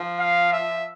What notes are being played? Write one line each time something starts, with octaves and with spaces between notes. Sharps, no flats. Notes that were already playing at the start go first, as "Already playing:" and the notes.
Already playing: F3
F5
E5